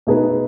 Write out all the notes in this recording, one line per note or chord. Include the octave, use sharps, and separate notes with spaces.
B2 A3 D#4 G#4 B4